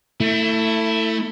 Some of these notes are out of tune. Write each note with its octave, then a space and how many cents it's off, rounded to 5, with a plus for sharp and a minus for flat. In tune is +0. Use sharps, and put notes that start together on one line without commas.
A3 +25 E4 +0